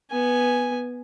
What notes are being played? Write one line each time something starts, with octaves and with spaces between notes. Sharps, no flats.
B3 G#5